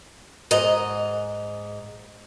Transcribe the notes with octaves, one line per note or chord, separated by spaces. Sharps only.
G#2 D#5 A#5